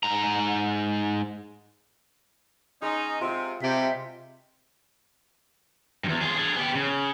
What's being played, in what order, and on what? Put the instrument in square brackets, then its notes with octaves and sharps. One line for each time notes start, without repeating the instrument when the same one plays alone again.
[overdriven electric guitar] G#2 A#5
[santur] G#3 [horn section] C#4 D#4
[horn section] C3 [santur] F4 E6
[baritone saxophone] C3 [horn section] G3 G4 [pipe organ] E5
[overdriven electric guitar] E2 G2
F4 G#4
D4 G#4
B3 G4
C#3